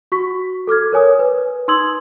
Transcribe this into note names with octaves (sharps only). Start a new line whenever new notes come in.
F#4 C#6 B6
A4 D6 F6 G#6
A#4 C#5 G#5 D#6
B4
D#4 C6 D#6 E6 G#6 F#7